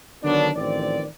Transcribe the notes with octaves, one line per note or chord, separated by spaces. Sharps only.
D3 D#3 F#3 B3 D4
A1 D#3 F3 C4 D5